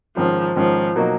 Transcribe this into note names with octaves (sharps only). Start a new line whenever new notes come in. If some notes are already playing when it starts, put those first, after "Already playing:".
G#2 D#3 F3 G#3 C#4
G#2 D#3 F3 G#3 C#4
B2 F#3 A#3 D#4 F#4